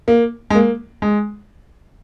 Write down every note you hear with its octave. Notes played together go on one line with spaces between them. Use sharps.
A#3
G#3
A#3
G#3